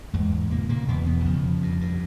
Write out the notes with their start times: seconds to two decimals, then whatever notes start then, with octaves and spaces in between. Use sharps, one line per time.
0.13 E2 G#2 G#3
0.32 E2
0.51 A#2 C#3 A#3
0.69 A#2 C#3 A#3
0.88 E2 B2 B3
1.06 E2 B2 B3
1.20 E3
1.25 F2 C#3 F3
1.44 C#3
1.62 G2
1.81 G2